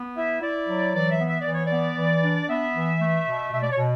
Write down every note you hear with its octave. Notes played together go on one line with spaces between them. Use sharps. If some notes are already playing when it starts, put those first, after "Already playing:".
Already playing: B3
E4 E5
E4 D5
F#3
E3 D5
E5
B3
E5
E3 D5
C#5
B3 D5
E3
D4
B3 E5
E3
A3
B2
B2 E5
D5
C#5
B2